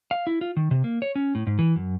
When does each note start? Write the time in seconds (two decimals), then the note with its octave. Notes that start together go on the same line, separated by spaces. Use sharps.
0.11 F5
0.27 E4
0.41 F4
0.57 D#3
0.71 C3
0.84 A#3
1.02 C#5
1.15 C#4
1.35 A2
1.47 G#2
1.59 E3
1.76 F#2